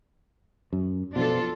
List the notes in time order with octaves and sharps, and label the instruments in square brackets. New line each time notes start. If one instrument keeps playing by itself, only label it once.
[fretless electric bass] F#2
[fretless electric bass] B2 F3 [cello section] D4 F4 A4